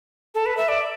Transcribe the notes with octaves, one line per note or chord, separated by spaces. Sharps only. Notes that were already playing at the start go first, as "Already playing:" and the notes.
A4
B4
E5
D5